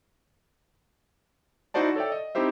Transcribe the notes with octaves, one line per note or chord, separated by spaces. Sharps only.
D#4 E4 F#4 C5 D5 A5
A4 C#5 D5 E5 G5
D#5
C4 D#4 E4 G4 C5 E5